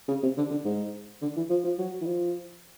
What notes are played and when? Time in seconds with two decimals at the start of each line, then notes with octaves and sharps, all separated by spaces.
0.08 C#3
0.23 C3
0.37 D3
0.51 D3
0.65 G#2
1.22 D3
1.36 E3
1.50 F3
1.64 F3
1.78 F#3
2.01 E3
2.06 F3